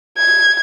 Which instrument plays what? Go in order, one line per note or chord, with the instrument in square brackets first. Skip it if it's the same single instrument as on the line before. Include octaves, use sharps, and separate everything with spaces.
[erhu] G#6